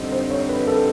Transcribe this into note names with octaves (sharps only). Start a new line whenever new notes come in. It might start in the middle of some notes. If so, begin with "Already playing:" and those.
Already playing: F2 D3 G3 C4 D#4
C5
C#5
B4
A4